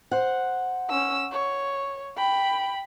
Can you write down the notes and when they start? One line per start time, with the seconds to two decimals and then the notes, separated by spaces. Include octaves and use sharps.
0.11 C5 F#5
0.90 C#4 E6
1.32 C#5
2.17 G5 B5